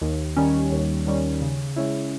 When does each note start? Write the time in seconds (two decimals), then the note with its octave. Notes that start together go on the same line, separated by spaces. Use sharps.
0.02 D#2
0.37 D#3 G3 C#4
0.72 D#2
1.07 D#3 G3 C#4
1.42 C#3
1.76 G#3 C#4 E4